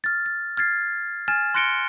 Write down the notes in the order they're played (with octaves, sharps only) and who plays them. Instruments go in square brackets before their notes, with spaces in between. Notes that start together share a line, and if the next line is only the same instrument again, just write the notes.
[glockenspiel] F6 A6
A6
F6 G#6 A6 C7
G#5 F6 G#6 A6 E7
C6 F#6 A#6 C#7 D7 G7